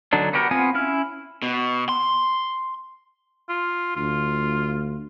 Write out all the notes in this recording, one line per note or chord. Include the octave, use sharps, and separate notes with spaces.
D3 F#3 D4 D#4
B3 F#4 G4 A#4
B3 C4 F4 G#5 D#6
C#4 E4 F6
B2
C6
F4
D2 F4